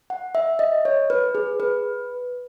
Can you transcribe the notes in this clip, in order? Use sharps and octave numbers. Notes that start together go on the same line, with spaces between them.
F#5
E5
D#5
C#5
B4
G#4
B4